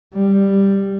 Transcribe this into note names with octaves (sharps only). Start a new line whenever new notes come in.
G3